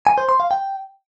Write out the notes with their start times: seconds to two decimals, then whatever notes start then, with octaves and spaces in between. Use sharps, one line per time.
0.07 G#5
0.18 C5
0.29 C6
0.40 F5
0.51 G5